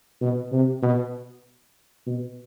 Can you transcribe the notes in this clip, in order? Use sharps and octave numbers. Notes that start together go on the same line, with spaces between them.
B2
C3
B2
B2